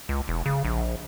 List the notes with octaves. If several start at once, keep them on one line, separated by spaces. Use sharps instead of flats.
C#2
E1
C#3
A#1